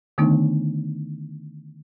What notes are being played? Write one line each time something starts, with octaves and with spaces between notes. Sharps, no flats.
D3 D#3 A3 B3 D4 D#4